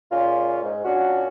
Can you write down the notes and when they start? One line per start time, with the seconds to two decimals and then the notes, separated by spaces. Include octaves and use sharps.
0.11 A#2 G#3 A#3 C#4 F4
0.63 G#2
0.84 A#2 C#4 D4 F#4